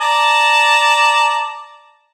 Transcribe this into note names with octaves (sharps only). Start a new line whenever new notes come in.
D5 A5 A#5